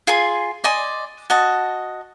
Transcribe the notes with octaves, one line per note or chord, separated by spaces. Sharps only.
F4 G#4 G#5 C6
D5 D#5 G#5 C6
F#4 D#5 A5